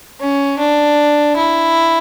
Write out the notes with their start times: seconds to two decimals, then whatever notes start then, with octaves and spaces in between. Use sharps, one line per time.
0.20 C#4
0.59 D4
1.36 E4